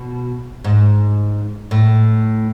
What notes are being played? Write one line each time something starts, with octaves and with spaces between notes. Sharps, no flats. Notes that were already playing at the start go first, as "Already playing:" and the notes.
Already playing: B2
G#2
A2